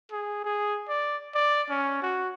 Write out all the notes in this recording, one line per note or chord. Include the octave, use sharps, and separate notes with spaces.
G#4
G#4
D5
D5
C#4
F#4